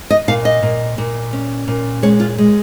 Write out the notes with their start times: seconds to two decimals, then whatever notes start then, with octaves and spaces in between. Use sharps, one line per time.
0.10 D#5
0.28 A#2 F5
0.45 D#5
0.63 A#2
0.98 A#2
1.33 C#4
1.68 A#2
2.02 G#3 C#5
2.20 F4
2.38 G#3